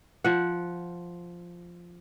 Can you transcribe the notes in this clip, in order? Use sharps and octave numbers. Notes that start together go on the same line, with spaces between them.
F3 F#5